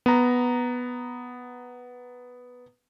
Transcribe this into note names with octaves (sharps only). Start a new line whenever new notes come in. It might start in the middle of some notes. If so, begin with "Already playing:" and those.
B3 A#5